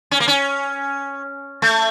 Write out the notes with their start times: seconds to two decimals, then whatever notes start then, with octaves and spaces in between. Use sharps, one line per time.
0.11 C#4
0.20 A#3
0.28 C#4
1.62 A3